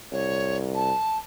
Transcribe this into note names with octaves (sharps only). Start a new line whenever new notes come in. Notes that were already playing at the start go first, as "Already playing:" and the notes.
C2 C#5
A5